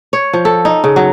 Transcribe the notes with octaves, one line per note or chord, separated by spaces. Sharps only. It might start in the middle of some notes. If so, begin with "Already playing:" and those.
C#5
F3
A4
D#4
C#3
F#3